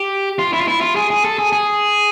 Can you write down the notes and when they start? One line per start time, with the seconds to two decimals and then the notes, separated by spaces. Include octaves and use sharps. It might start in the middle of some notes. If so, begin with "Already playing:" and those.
Already playing: G4
0.39 F4
0.53 E4
0.61 F4
0.68 E4
0.81 F4
0.96 G#4
1.10 G#4
1.25 A4
1.39 G#4
1.53 G#4